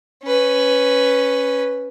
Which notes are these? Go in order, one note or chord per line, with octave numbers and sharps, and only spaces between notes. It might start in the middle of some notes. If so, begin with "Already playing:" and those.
C#4 B4